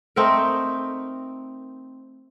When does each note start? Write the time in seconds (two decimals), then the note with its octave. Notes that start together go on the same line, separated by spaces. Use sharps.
0.16 A3 C4 D#4 A#4